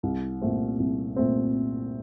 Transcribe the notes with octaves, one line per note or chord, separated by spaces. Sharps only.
C2
A#2 A3 C4
C2
A#2 A3 C4